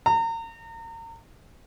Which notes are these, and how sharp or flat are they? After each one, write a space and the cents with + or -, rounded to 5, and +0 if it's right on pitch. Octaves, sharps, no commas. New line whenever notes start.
A#5 -35